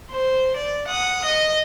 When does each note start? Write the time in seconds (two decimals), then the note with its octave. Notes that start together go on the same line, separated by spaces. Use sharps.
0.10 C5
0.56 D5
0.88 F#5 D#6
1.25 D#5